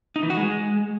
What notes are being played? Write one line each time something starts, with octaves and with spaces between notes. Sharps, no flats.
D#4
E3
F#4
G#3